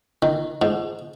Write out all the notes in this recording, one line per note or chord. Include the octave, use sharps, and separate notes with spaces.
D#3
G#2